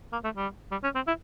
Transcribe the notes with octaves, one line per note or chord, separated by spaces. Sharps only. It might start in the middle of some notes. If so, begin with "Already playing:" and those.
A#3
A3
G3
G3
C#4
C4
E4